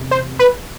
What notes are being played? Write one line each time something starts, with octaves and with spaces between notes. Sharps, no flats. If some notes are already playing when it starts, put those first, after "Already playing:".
Already playing: E2 C3
C5
B4